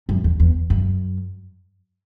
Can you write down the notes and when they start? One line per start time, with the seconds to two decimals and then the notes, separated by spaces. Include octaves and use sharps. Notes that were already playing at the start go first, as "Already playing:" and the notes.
0.09 F#2
0.24 E2
0.40 E2
0.70 F#2